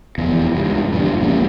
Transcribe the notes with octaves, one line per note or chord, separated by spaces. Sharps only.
F1 E2 E3
C#2 G2
E1 A#1 G2 D3
E1 A#1 A#3 C#4